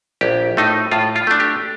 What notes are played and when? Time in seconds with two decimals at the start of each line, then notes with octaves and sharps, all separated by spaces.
0.21 A#1 G4
0.57 A2 A3 D#4
0.92 A2 F4
1.16 F4
1.27 A3 D4
1.40 G4